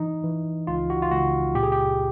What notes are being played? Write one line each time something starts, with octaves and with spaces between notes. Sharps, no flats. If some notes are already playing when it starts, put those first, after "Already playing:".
Already playing: E3 D#4
E3
C#2 F4
F#4
F4
C#2 F#4
A#2 G4
G#4
G4